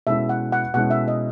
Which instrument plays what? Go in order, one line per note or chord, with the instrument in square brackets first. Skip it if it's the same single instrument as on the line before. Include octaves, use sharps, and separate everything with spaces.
[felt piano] B2 G#3 C#4 E4 [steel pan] E5
[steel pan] F#5
F#5
[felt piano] B2 G#3 C#4 E4 [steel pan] F#5
[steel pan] E5
D#5